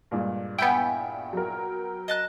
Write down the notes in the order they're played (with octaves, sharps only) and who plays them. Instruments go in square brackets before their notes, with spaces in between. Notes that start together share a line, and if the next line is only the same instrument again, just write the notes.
[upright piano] G2 A#2 G#3
[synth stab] B3 G5 [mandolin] E4 G#5 G6
[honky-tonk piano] F#3 A#4
[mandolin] D#5 A5 F#6